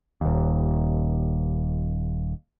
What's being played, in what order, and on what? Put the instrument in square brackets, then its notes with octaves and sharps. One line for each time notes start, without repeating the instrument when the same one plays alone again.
[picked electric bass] D#1 D#2